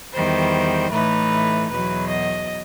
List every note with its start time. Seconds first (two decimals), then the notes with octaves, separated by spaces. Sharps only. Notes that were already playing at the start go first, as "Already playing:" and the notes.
0.13 E2 D#3 G3 C5
0.92 A2 E3 A3 D#4 B4
1.70 E2 B2 F#3 B4
2.10 D#5